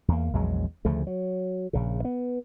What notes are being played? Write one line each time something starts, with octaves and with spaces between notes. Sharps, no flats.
E2 A#3
A#1 E2 F#3 G#3
D2 C#3 F3 A3
F#3
A#1 C#3
B3